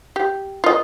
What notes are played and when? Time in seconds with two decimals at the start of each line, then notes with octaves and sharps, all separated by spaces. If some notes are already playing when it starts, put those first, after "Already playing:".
0.16 G4
0.64 F4 D#5